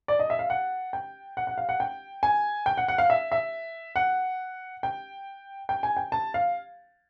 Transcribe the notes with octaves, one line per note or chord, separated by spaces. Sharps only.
D5
D#5
E5
F5
F#5
G5
F#5
F#5
F5
F#5
G5
G#5
G5
F#5
F#5
F5
E5
E5
F#5
G5
G5
G#5
G5
A5
F5